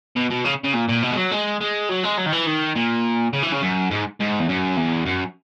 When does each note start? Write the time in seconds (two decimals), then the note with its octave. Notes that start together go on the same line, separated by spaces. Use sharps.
0.16 B2
0.31 B2
0.45 C#3
0.64 C#3
0.74 A#2
0.89 A#2
1.02 B2
1.11 G#3
1.17 F#3
1.31 G#3
1.61 G#3
1.89 F#3
2.03 G#3
2.18 F#3
2.26 D#3
2.32 E3
2.46 D#3
2.76 A#2
3.33 C#3
3.43 E3
3.52 C#3
3.62 F#2
3.91 G#2
4.20 G#2
4.39 E2
4.48 F#2
4.77 E2
5.06 F#2